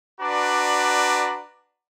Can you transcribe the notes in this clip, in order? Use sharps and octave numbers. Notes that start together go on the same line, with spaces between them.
D4 F#4 B4 D5 A#5